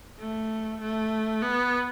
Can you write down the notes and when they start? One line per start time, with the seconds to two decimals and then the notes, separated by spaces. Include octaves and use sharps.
0.19 A3
0.81 A3
1.42 B3